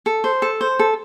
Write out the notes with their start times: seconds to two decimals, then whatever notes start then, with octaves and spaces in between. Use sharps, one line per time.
0.06 A4
0.24 C5
0.42 A4
0.61 C5
0.79 A4